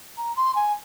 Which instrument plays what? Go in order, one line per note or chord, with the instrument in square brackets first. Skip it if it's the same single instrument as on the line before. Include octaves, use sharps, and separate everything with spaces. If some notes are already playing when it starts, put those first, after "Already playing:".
[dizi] A#5
C6
G#5